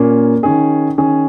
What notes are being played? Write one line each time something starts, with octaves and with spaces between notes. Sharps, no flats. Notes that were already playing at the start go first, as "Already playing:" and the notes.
Already playing: A#2 A#3 C#4
D#3 C#4 G#4
D#3 C#4 G#4